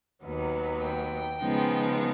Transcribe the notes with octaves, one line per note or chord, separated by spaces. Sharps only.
D#2 D#3 F#3 B3
G5
C#3 F3 G#3 B3 D#4